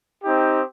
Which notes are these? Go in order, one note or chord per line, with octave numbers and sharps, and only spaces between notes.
C4 D#4 G4